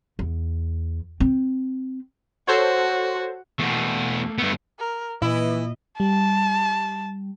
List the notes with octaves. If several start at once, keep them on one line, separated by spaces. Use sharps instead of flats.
E2
C4
F#4 A4 C5 C#5
E2 B2 A3 A#3
G2 A3 B3
A#4
A#2 E3 E4 D#5
G3 A5